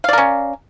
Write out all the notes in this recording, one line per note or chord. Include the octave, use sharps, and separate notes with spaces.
C#4 A#4 D5 F5